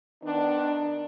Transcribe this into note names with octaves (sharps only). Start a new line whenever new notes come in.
D#3 B3 D4